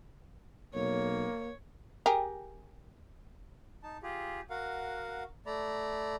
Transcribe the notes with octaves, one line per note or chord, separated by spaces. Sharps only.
B1 A#3 C#5
G4 G#4 A#4
D#4 A5
F4 G4 G#4
F#4 A#4 F5 F#5
A3 D5 A#5 B5